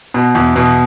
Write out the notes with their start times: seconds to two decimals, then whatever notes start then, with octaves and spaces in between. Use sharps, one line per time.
0.14 B2
0.35 E2
0.56 B2